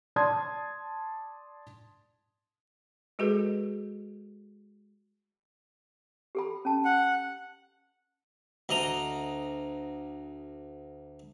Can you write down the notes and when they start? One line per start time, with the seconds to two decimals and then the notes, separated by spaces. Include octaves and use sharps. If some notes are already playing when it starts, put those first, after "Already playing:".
0.16 D5 A5 C6 D#6 G#6
3.19 G#3 F#4 G#4 A4 B4
6.35 G4 A4 B5
6.65 C#4 A5
6.85 F#5
8.69 D2 D#5 A#5